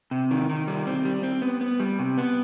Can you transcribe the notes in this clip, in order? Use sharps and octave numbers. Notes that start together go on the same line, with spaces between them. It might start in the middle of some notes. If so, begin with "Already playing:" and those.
C3
D#3
D#3
G3
C4
G3
C4
B3
B3
G3
C3
B3